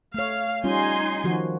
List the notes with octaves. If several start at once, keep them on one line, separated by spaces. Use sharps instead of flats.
A3 C#5 F5
G3 C#4 D#4 F4 G#5 C6
D#3 F3 F#4